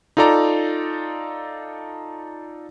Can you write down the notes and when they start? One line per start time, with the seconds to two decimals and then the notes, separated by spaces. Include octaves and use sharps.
0.17 D#4 F4 A4 D5 A#5